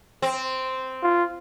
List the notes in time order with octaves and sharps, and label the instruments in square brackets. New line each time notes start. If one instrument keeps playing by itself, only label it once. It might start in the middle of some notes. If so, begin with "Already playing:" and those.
[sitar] C4
[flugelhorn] F4